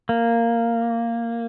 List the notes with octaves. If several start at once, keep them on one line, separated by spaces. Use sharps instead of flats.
A#3